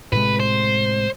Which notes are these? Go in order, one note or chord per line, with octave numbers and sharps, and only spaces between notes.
A2 C3 G#3 B4
C5